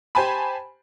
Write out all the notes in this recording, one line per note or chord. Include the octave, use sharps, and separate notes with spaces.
G4 C5 G#5 A5 B5